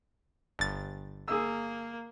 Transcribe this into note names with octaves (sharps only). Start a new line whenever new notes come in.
G1 A6
A#3 G#4 E6